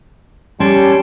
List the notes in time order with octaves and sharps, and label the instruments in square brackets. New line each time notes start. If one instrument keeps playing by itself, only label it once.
[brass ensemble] G3 [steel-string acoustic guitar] C#4 [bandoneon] G5 A5 C6